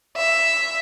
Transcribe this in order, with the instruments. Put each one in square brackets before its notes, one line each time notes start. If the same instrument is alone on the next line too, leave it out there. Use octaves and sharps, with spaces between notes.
[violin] E5